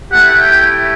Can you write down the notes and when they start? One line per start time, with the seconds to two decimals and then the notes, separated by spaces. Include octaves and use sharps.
0.11 A3 E4 G4 F#5
0.40 G5